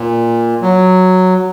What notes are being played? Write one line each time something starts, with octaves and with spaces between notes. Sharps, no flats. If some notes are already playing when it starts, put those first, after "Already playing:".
Already playing: A#2
F#3